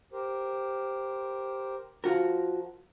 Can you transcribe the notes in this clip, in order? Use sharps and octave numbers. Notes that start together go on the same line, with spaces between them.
G4 A#4 C5
F3 F4 F#4 A#4